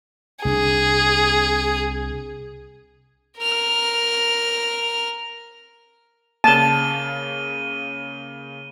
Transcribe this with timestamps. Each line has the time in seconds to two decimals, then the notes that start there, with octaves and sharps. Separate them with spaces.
0.45 C2 C#4 D4 G#4
3.38 A#4 F6
6.44 C#3 A#3 A5 D#7 G7